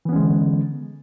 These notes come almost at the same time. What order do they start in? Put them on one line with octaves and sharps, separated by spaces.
E3 B3 C#4 G#3 D3